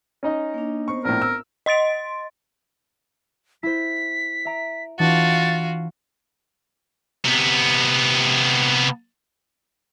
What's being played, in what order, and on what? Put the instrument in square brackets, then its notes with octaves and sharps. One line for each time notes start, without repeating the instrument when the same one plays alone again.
[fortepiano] C#4 D#4 D#5
[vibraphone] A#3 D4
[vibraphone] B3 C4 C5 [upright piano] C#6
[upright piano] A#1 A2 [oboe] A#4
[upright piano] E6
[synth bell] D#5 C6 A6 D7
[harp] E4 C5 [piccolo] B6
[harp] E5 A#5 D7
[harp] E3 D4 [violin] F4 F#4 [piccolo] A6
[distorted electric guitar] C3 B3